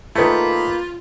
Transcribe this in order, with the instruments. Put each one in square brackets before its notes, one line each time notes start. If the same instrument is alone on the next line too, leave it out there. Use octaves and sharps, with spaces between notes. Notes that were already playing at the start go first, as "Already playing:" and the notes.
[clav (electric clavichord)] D#3 A3 [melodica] A#3 B5 [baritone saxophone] F4 [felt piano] G#4 B4 C5